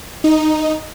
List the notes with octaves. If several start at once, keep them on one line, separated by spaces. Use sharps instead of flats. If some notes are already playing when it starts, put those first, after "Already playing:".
D#4